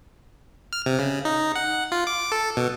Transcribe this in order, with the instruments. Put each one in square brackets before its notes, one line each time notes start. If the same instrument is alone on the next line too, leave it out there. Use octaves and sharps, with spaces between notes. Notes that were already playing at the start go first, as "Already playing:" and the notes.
[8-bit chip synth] F6
C3
C#3
D#4
F#5
F4
D6
A4
B2